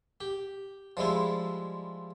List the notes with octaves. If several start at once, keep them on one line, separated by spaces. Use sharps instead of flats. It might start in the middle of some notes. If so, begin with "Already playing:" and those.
G4
F3 G3 G#3 E4